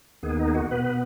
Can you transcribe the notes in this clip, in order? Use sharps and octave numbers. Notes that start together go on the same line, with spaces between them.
D#2 D#3 B3 G#4
D#4
G#4
F#4
B2 B3 B4